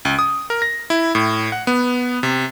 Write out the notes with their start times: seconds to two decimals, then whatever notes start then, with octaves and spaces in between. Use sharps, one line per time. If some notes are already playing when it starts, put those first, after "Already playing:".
0.05 C#2
0.19 D#6
0.50 A#4
0.62 A#6
0.90 E4
1.15 A2
1.52 F#5
1.67 B3
2.23 C3